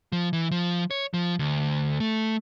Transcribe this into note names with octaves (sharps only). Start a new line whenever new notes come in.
F3
E3
F3
C#5
F3
D2
A3